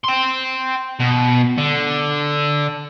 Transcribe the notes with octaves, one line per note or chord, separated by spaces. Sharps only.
G5 C6
B2
D3